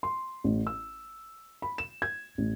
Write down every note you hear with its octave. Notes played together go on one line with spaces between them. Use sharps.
C6
A1
E6
B5
E7
G#6
A1